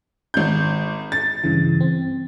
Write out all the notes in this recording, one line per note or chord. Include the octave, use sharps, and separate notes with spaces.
G#1 G6
A6
G2 C#3 E3
C4